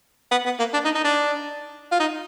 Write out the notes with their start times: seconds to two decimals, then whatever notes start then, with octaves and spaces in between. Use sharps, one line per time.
0.31 B3
0.46 B3
0.59 A#3
0.73 D4
0.85 D#4
0.95 D#4
1.04 D4
1.92 F4
2.00 D#4